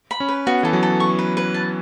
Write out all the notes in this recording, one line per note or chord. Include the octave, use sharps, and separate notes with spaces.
B5
C#4
B4
B3 F#4
E3 A4
F#3
A4
C#6
B4
B4
A5